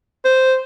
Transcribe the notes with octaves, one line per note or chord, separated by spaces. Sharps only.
C5